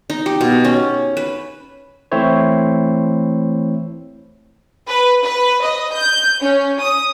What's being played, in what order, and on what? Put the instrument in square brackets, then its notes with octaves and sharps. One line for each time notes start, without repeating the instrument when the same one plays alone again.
[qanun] D#4
G4
B2
C#4
B4
[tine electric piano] E3 A3 C4 E4 C5 C#5
[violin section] B4
B4
D#5
G6
C#4
D#6